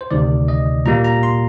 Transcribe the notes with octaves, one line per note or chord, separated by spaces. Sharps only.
C5
D2 C3 D#3 D5
D#5
A#2 G3 A#3 A#5
A#5
C6